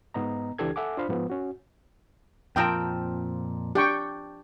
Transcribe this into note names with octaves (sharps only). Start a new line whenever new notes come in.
G#2 B3 D#5 A#5
C#2 E3 D4 G4 A4 G#6
A4 E5 F#5 G#5 D6
D4 F4 C5 F5 B5
G#2 F3 B3 B4
C#4 F#4
F2 A#2 F3 C4 A#4 G5 A5
D4 G4 G5 C#6